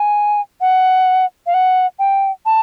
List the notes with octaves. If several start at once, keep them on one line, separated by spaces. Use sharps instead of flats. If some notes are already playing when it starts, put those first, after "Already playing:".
Already playing: G#5
F#5
F5
F#5
G5
A5